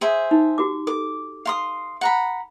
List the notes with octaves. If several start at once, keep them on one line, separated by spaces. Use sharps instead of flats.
G#4 C5 E5
D#4
F#4 G4 D6
A4 D6
F5 C6 D#6
F#5 A#5 B5